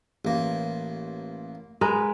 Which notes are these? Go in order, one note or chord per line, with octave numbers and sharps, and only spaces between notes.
A1 A#3
G#3 A#4 B4